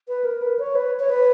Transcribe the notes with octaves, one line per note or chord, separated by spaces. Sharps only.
B4
A#4
B4
C#5
B4
C#5
B4